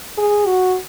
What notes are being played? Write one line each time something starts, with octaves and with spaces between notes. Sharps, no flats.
G#4
F#4